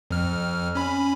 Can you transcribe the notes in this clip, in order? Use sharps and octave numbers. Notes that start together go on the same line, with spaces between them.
F2 F6
C#4 B5